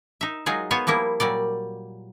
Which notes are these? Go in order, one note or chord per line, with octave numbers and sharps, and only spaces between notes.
D#4 E5
F#3 G#3 D#4 F4 G#4
B3 F4 C5 C#5 G#5
F3 G3 A#3 E4
A#2 F#3 G3 D5